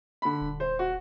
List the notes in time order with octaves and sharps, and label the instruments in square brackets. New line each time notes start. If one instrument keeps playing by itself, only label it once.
[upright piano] D3 B5
[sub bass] D#1
[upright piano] C5
F#4